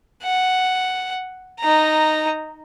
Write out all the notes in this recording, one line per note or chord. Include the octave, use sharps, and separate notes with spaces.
F#5
D#4 A#5